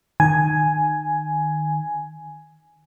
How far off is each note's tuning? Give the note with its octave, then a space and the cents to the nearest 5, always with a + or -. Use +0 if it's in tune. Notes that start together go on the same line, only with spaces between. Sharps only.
D#3 -20 G#5 +5